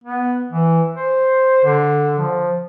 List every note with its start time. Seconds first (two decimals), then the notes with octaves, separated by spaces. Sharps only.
0.04 B3
0.52 E3
0.95 C5
1.64 D3
2.18 F3